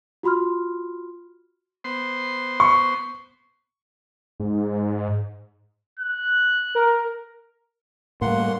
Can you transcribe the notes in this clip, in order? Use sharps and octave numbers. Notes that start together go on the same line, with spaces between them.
F4 F#4 B5 C6 F6
B3 C5 C6
C#6
G#2
F#6
A#4
A2 G3 A#3 F#5 C6